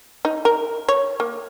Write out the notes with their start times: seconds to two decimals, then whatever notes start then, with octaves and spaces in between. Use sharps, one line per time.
0.25 D#4
0.45 A#4
0.88 C#5
1.20 A#3